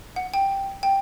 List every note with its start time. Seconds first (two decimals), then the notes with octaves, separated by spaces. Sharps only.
0.16 F#5
0.34 G5
0.83 G5